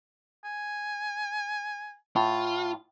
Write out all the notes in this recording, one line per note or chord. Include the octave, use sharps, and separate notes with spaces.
G#5
A2 F4